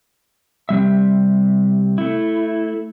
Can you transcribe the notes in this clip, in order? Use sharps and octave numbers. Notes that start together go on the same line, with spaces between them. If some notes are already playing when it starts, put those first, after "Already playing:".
C3 G3 E5
A3 E4